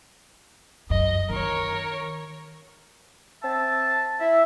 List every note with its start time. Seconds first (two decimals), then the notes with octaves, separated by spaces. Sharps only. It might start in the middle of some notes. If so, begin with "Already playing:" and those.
0.90 F#2 D#5
1.30 D#3 A#4 C#5
3.42 C4 E5 A5
4.20 E4 E5